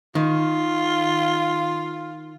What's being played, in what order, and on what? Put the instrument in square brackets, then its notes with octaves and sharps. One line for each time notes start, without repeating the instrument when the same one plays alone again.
[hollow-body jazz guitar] D#3 [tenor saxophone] F4